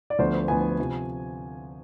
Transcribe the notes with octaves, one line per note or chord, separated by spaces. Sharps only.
D5
D2 D3 F3 B3 C5
D2 D3 F3 B3 G#5
C3 F3